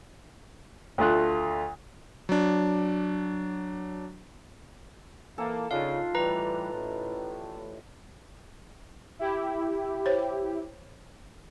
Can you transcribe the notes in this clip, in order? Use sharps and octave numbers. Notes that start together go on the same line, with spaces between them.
D2 A3 F4 F#6
F#3 D4
E3 A#3 A4 A5
C#3 D4 D#4 F4 F5
A2 E3 G3 B4 A#5
A1 A2
E4 G4
C5 C#5